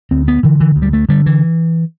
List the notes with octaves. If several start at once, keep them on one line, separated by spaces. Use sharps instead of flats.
D2 C4
B3
D3 E3
E3
D2
G3
A3
D3 G3
E3